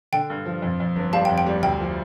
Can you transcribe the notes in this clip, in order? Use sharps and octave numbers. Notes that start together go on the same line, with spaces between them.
D3 G5
G2
F3
F2
F2
G1
G3 F5 A5
G5
F2
G5
G3
D2 G5
F3